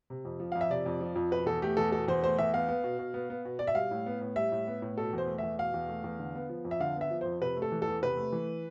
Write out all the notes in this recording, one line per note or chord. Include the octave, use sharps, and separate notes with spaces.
C3
F2
F3
F2 F5
E5
C3 D5
F2
F3
F2
B2 B4
E2 A4
A3 G4
E2 A4
B2 A4
E2 C5
A3 C5
E2 E5
B3 F5
B3
B2
B2
B3
B3
B2
B2 D5
E5
G3 F5
A2
B3
A2
G3 E5
A2
B3
A2
B2 A4
E2
C5
A3
E2 E5
B2 F5
E2
A3
E2
D3
B3
F3
F2
E5
D3 F5
B3
E5
F3
F2 C5
C3 B4
A3
A4
E3
A4
E2
C3 B4
A3
E3